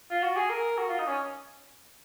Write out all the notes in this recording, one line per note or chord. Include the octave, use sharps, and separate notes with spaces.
F4
F#4
G#4
A#4
F#4
F4
D#4
C#4